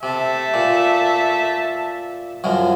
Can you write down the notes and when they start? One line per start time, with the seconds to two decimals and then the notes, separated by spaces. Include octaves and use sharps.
0.03 C3 E5 A5
0.54 A#2
2.44 C2 F#2 F3